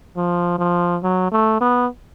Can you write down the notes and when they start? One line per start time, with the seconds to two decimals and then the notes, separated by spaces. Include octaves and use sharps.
0.16 F3
0.59 F3
1.03 F#3
1.32 A3
1.61 B3